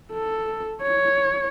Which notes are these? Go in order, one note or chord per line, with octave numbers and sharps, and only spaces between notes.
A4
C#5